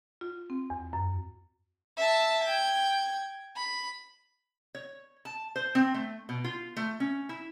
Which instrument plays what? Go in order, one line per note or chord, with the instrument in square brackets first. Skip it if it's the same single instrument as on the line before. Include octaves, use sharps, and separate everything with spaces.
[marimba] F4
C4
E2
F#2
[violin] E5 A5
G5 G#6
B5
[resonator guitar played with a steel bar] C#5
A5
C5
C4
A3
B2
F4
A3
C#4
E4